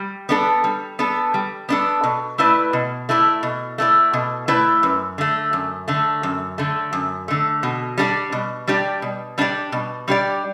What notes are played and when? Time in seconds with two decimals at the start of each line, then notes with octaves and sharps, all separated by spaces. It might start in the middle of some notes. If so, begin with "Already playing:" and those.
Already playing: G3
0.29 B3 D4 A4
0.64 G3
0.99 B3 D4 A4
1.34 G3
1.69 B3 D4 A4
2.04 B2
2.38 A3 E4 B4 D5
2.73 B2
3.09 A3 E4 B4 D5
3.43 B2
3.78 A3 E4 B4 D5
4.13 B2
4.48 A3 E4 B4 D5
4.83 F#2
5.18 D3 A3
5.53 F#2
5.88 D3 A3
6.23 F#2
6.58 D3 A3
6.93 F#2
7.28 D3 A3
7.63 B2
7.98 G3 D4 G4 D5
8.32 B2
8.67 G3 D4 G4 D5
9.02 B2
9.38 G3 D4 G4 D5
9.72 B2
10.08 G3 D4 G4 D5